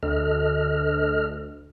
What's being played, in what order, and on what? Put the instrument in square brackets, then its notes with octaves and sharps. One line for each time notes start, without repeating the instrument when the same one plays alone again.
[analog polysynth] D2 [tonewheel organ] A4 D#5 F6